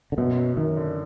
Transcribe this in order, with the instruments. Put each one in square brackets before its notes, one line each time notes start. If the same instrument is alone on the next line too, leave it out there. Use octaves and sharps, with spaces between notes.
[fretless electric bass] D3
[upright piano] F#2 [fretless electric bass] B2
[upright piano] F#3
[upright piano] F#2 [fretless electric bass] D#3
[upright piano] D3